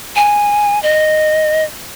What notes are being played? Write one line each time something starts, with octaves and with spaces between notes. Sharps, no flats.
G#5
D#5